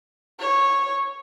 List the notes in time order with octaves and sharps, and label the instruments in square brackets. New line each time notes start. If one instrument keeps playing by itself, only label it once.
[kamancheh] C#5